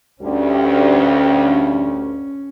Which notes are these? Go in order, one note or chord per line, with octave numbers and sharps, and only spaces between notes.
D2 G2 C#4